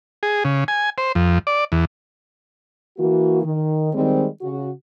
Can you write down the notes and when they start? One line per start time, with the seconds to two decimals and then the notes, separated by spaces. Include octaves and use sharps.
0.23 G#4
0.45 C#3
0.68 G#5
0.98 C5
1.15 F2
1.47 D5
1.72 E2
2.98 E3 A#3 F#4
3.43 D#3
3.94 D#3 G3 G#3 C4
4.41 C#3 F#4